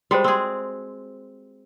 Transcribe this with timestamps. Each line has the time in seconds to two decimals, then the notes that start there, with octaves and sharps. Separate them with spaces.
0.11 G3 G#3 F#4 C5
0.24 C4 G#4